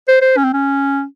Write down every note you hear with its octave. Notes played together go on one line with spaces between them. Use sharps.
C5
C5
C#4
C4
C#4